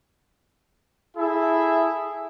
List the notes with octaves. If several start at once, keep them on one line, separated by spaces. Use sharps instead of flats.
E4 G#4 A4 E5